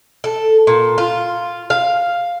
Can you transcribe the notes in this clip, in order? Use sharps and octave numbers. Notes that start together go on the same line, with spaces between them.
A4
A#2
F4
F5